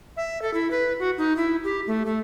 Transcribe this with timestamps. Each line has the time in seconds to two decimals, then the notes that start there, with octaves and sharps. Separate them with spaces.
0.17 E5
0.42 A4
0.54 E4
0.71 B4
0.99 F#4
1.18 D#4
1.37 E4
1.64 G4
1.87 A3
2.06 A3